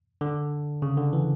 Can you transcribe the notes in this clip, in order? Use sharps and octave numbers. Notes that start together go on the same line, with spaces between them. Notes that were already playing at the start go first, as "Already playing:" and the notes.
D3
C#3
D3
E3